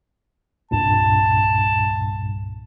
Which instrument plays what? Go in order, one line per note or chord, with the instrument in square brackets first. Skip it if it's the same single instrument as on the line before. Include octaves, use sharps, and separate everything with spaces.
[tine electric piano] C2 G2 A#2 [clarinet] A5